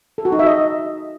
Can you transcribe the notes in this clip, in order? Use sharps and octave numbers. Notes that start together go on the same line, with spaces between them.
A4
F#4
D#4
E5
D#5